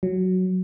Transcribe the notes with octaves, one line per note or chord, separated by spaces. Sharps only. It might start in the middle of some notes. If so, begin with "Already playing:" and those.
F#3